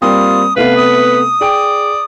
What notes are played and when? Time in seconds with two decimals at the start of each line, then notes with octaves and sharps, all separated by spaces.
0.02 G3 A#3 C4 F4 D#6
0.56 C3 A3 B3 B4 F5
0.77 D#6
1.41 G#4 D5 G5 D7